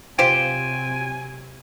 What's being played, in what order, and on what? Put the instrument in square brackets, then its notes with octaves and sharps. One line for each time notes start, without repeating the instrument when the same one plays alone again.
[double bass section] C3 F#3 C4 [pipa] F4 G4 C5 [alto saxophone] G#5 [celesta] D7